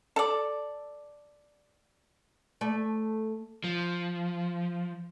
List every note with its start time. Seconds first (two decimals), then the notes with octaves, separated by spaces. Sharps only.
0.16 A4 D5
2.61 A3 D5
3.64 F3